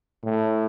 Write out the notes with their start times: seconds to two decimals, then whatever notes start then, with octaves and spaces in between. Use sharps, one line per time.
0.24 A2